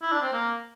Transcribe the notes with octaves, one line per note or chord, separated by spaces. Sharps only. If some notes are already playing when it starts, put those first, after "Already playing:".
E4
D4
C4
A#3